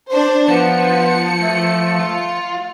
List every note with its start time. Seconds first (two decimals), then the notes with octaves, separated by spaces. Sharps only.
0.10 D4 C5
0.49 F3 B3 C#7
1.41 A3
1.99 F4